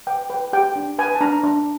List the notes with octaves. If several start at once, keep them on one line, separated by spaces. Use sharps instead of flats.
B4 G5
B4 G5
G4 G5
D4
B4 G#5
A5
D4 A#5
D4